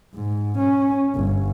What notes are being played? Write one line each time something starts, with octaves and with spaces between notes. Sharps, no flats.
G#2
C#4
G1